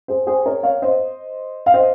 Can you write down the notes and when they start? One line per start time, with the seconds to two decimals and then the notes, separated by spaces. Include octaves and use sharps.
0.08 G#4 C5
0.27 G#4 C5
0.46 A#4 C#5
0.63 C#5 F5
0.82 C5 D#5
1.66 F5
1.74 C5 D#5